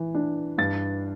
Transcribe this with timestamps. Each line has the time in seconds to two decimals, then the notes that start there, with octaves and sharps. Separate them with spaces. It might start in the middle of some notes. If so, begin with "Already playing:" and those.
Already playing: E3
0.15 D4
0.58 G2 A6